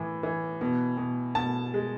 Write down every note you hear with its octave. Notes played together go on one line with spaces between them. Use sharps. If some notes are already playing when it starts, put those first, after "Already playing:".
Already playing: A2 E3
E3
B2
B2
B2 A5
G#3